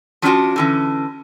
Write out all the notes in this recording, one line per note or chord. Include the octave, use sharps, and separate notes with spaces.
F3 F#3 C#4 D4 F4 F#4
D3 E3 C#4